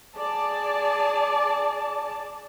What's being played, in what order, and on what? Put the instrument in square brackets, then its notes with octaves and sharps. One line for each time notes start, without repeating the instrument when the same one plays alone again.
[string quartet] G#4 A5 [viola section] D5